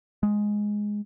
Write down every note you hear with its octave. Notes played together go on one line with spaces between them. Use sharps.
G#3